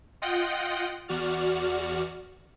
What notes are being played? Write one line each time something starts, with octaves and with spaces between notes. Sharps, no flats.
F4 D#5 F#5 G5
E2 F#4 D5 F6